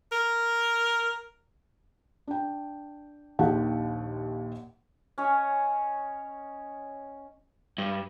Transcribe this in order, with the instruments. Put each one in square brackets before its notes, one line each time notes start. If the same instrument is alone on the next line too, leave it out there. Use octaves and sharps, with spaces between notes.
[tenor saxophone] A#4
[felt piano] D4 G5
A#1 D#2 D#3 G4 F#5 A5
[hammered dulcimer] C#4 C#5 D#5
[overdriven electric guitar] G2